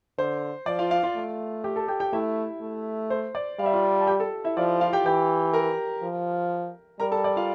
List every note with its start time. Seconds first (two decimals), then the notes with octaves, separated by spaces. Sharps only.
0.18 D3 C5
0.66 F3 D5
0.79 F4 F5
0.91 F4 F5
1.03 F4 F5
1.15 A3
1.64 G4 G5
1.76 A4 A5
1.88 G4 G5
2.00 G4 G5
2.13 A3 E4 E5
2.61 A3
3.10 C5
3.35 D5
3.59 G3 F5
3.66 E5
3.73 F4 F5
4.01 A5
4.07 G4 G5
4.20 A4 A5
4.44 E4 E5
4.57 F3 D5
4.81 F4 F5
4.93 G4 G5
5.05 E3 G4 G5
5.53 A#4 A#5
6.03 F3
7.00 G3 A#4 A#5
7.11 A4 A5
7.24 D5
7.36 F4 F5